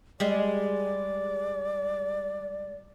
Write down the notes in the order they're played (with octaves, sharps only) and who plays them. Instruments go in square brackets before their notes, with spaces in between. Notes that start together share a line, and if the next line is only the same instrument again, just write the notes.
[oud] G3 G#3 [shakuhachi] D5